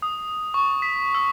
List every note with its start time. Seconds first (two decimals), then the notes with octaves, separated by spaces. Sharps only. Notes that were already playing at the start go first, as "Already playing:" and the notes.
0.02 D#6
0.54 C#6
0.82 B6
1.15 E6